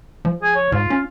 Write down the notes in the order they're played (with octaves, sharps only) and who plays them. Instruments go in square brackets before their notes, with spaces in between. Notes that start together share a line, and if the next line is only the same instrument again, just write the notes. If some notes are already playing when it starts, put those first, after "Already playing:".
[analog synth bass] F3
[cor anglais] G#4
C#5
[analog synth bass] G#2 [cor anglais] F4
[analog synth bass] C#4